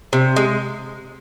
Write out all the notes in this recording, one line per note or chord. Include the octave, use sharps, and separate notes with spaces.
C3
G#3